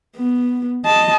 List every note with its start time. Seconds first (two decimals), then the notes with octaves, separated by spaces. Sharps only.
0.17 B3
0.85 D#5 A5